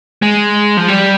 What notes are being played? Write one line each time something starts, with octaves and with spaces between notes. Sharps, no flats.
G#3
F3
G3